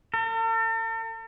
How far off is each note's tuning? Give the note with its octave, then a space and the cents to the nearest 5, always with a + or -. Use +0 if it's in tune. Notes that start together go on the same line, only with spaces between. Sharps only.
A4 +45